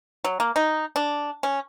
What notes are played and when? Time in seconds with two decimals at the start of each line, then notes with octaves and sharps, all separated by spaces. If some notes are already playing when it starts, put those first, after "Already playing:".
0.24 F#3
0.40 A#3
0.56 D#4
0.96 D4
1.43 C#4